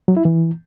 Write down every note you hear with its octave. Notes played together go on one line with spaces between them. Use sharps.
F#3
E4
E3